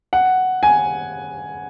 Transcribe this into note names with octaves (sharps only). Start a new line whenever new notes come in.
F#5
G#5